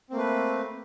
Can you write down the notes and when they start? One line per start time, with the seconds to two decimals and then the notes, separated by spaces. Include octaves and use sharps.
0.10 C4
0.13 A#3
0.16 A3
0.18 B4